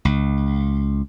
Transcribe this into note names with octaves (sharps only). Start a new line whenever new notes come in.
C#2